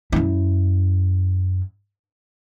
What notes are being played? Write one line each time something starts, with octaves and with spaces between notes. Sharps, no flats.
F#2 E4